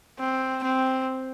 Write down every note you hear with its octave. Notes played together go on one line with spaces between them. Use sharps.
C4
C4